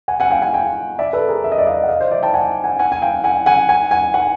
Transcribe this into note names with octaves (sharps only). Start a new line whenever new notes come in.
F#5 G#5
F#5 G#5
F5 G5
F#5 G#5
F5 G5
D5 E5
A4 B4
G#4 A#4
E5
D#5
D5 E5
D#5 F5
F#5
D#5 F5
C5 D5
D5 E5
G5 A5
F#5 G#5
F#5 G#5
F#5 G#5
G#5
F5 G5
F#5 G#5
F#5 G#5
F#5 G#5
F#5 G#5
F#5 G#5